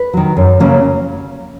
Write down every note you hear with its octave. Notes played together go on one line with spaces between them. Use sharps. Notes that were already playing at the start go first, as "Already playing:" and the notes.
Already playing: B4
D#3 F#3
F#2
C#3 F#3 A#3 C#4